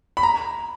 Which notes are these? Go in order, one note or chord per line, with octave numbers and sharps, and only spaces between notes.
B5
A#5